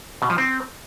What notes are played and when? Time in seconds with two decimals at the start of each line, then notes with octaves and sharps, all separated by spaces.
0.22 B2
0.30 F3
0.38 C4